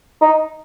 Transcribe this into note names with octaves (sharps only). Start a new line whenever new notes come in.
D#4